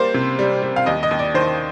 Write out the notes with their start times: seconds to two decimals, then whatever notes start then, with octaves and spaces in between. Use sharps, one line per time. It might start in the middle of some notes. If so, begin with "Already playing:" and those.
Already playing: G3 A#3 C5
0.14 C3
0.39 G3
0.63 G3
0.76 F5
0.86 D#2 D#5
1.03 D#5
1.11 D#2
1.19 D5
1.34 D#3 C5